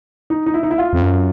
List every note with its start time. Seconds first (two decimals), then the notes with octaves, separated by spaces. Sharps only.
0.30 D#4
0.46 D#4
0.54 E4
0.63 D#4
0.71 E4
0.78 F4
0.93 F2
1.02 F#2